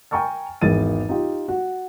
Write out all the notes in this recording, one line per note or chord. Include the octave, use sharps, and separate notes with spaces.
G5 G#5 A#5 C#6 F6 A6
G#1 E2 E3 G#4 A6 D#7
D#4 F4 G4
F#4